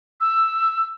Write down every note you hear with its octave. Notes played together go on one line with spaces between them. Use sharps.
E6